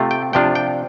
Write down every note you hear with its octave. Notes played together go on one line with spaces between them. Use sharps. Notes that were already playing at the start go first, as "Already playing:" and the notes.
Already playing: C3 A3 C4 F4
G5
C3 F3 D4 F4 G5
G5